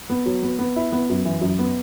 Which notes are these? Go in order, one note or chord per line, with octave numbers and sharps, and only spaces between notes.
B3
F#3
B3
B3
E4
B3
F#2
E3
F#2
B3